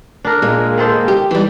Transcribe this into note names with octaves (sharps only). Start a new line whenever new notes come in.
D4 A#4
A#2 G#3 A#3
D#3 A4 C5
G4
E3 G3